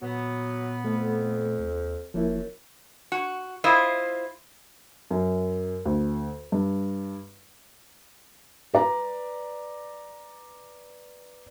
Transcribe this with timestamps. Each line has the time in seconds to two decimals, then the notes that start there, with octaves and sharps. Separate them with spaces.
0.02 A#2 F#3 B3
0.84 F2 A3
1.59 D#2
2.14 F1 F#2 F3 A#3 E4
3.12 F#4
3.64 E4 F4 C5 D#5
5.11 F#2
5.85 D2
6.52 G2
8.74 B4 D5 A#5